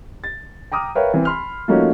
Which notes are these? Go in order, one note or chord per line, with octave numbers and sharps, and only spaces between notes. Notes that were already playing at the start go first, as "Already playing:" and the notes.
A6
G5 A#5 D6 D#6 F6
A#4 B4 C#5 E5 F5 G5
E3 C4
B5 C6 F6
F3 A3 A#3 C#4 D#4 F#4